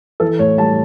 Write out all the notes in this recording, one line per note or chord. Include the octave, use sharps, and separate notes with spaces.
E3 A4
A2 C#5
G3 A5